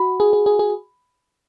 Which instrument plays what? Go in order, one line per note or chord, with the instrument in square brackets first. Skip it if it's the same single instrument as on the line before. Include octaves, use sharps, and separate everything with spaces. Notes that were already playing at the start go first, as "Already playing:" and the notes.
Already playing: [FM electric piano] F#4 [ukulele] B5
[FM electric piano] G#4
G#4
G#4
G#4